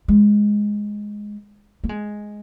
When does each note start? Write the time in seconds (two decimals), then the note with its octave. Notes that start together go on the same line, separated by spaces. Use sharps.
0.08 G#3
1.84 A#3
1.89 G#3